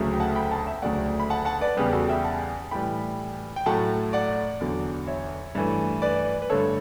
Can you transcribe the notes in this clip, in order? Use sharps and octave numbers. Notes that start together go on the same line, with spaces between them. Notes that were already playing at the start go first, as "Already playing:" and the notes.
Already playing: D2 C#3 F#3 A3
G5
F#5 A5
G5 B5
F#5 A5
E5 G5
D2 C#3 F#3 A3 D5 F#5
B5
F#5 A5
F#5 A5
B4 D5
E2 C#3 G3 G4 B4
F#4 A4
E5 G5
F#5 A5
A2 E3 G3 G5 B5
G5
A2 F#3 A3 F#5 A5
D5 F#5
E2 D3 F#3
C#5 E5
G2 E3 A3
B4 D5
B4
G2 D3 A3 A4 C#5